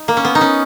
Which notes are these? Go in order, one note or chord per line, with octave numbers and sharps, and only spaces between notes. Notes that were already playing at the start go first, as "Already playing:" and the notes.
Already playing: D#4
A#3
C#4
B3
D#4
C#4